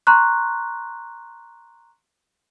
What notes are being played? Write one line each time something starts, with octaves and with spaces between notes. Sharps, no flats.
A#5 C6 C#6 F#6